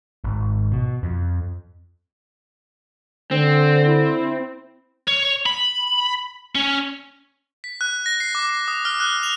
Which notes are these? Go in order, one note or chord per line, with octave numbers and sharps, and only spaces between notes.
G#1
B2
F2
D3 C4
E4
C#5
B5
C#4
B6
F#6
A#6
C7
D6
C7
D#6
F6
F#6
F7